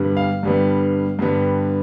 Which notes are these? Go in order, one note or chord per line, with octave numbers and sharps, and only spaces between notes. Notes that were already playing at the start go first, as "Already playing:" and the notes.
Already playing: G2 D3 G3 B3
F5
G2 D3 G3 B3
G2 D3 G3 B3